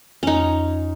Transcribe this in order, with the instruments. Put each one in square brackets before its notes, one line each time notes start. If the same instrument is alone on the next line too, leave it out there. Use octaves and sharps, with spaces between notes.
[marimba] F2 G#5 [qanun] C#4 D#4